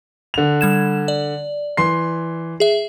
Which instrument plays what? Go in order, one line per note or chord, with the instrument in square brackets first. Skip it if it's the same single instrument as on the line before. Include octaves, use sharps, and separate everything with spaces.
[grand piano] D3 F7
[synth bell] G3 G#6 E7
D5
[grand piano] E3 C6 C7
[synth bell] G#4 E5